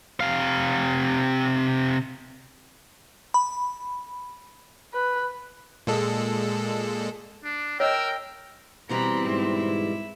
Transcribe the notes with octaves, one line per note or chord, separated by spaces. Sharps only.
C3 F5
B5
B4
A#2 G#3 A4
D4
A#4 C#5 D#5 G5 E6
B2 E3 G3 C4 A#5 B5
G#2 E4